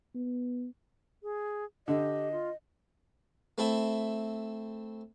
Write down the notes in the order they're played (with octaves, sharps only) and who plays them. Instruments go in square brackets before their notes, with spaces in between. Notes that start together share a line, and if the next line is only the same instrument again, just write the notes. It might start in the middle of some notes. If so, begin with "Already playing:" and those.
[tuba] B3
[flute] G#4
[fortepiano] D3 [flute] G4 [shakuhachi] D#5
[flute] F4
[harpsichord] A3 C4 E4 A4 E5